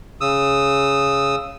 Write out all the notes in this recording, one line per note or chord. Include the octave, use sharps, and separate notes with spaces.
C#3 D#6 E6